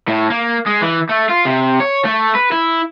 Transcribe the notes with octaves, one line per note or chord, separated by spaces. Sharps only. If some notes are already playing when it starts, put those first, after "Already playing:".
A2
A#3
G#3
E3
A3
F4
C3
C#5
A3
B4
E4